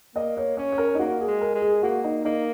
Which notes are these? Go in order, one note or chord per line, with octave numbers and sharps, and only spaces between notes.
A#3 D#5
C#5
C#4 C#5
C#5
A#4
D#4
A#3 F#4
G#4
G#3
A#4
G#3
G#4
G#4
A#3 F#4
D#4
A#3 D#4